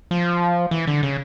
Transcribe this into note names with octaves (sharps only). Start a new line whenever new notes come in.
F3
E3
D3
C#3